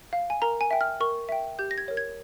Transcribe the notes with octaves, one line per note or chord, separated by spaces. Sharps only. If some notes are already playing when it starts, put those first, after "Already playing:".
F5
G#5
A#4 A#5
G#5
E5 G5
F6
A#4 C#6
E5 G5
G4 G6
A#6
G#6
A#4 C#5
G#6